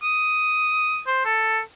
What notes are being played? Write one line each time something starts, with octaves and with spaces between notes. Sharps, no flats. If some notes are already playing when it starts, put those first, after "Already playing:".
D#6
C5
A4